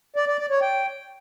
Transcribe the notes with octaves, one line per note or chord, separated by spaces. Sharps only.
D5
D5
D5
C#5
G5